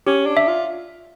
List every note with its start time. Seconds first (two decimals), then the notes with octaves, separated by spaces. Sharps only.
0.07 C#4 G4
0.26 D4
0.37 E5
0.47 F4